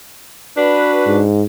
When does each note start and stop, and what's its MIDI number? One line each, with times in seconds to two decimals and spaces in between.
0.57 1.23 62
0.57 1.19 66
0.57 1.19 71
1.06 1.44 44